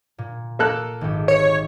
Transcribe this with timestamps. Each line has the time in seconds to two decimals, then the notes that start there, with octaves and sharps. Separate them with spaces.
0.18 A#2
0.59 A#3 A4 F#6
1.01 G#1 G4
1.28 C#5